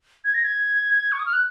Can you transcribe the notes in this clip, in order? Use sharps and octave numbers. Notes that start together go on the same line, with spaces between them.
G#6
A#6
G#6
C#6
D#6
F6
F#6